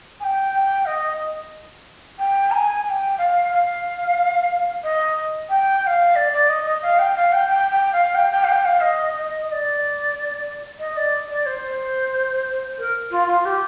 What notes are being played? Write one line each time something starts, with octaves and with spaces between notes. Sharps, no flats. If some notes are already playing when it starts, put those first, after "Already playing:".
G#5
G5
G5
D#5
G5
A#5
G#5
G#5
G5
F5
F5
D#5
G5
G5
F5
D5
D5
D#5
D#5
F5
G5
F5
G5
G5
G5
F5
G5
G5
F5
G5
F5
D#5
D#5
D#5
D5
D#5
D5
D5
C5
A#4
F4
F4
G4